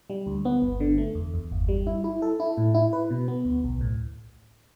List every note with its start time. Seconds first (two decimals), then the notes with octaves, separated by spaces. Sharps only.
0.10 G3
0.27 D2
0.45 B3
0.62 G1
0.80 D3
0.98 A3
1.15 E2
1.34 E2
1.52 G1
1.68 G3
1.87 E4
2.04 E4
2.22 A4
2.40 E4
2.57 A2
2.74 E4
2.93 B4
3.10 B2
3.28 B3
3.45 D2
3.64 B1
3.81 A2